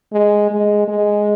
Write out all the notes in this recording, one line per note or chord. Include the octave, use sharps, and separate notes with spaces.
G#3
G#3
G#3